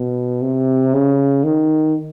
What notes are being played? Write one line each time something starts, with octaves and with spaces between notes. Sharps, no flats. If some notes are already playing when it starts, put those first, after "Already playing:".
Already playing: B2
C3
C#3
D#3